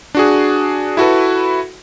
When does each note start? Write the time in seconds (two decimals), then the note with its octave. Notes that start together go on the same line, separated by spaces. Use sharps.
0.15 D4 F#4 G#4
0.97 E4 F#4 A4 B4